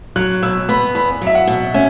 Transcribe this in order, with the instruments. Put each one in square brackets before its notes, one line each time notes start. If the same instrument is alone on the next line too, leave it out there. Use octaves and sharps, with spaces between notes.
[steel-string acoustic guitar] F#3 [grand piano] F#6
[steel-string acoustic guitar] B2 [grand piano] E6
[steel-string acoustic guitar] B3 [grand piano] B5
[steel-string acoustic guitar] E2 [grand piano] B5
[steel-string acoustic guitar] F#3
[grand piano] E5
F#5
[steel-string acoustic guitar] B2
[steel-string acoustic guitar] C#4 [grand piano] E5